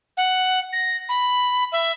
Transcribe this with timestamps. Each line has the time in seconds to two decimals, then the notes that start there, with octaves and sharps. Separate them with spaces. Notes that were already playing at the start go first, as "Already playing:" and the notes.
0.17 F#5
0.73 A#6
1.09 B5
1.72 E5